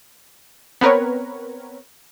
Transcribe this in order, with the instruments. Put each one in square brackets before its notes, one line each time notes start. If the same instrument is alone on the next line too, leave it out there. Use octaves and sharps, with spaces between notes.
[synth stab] B3 C4 A#4 B4 C#5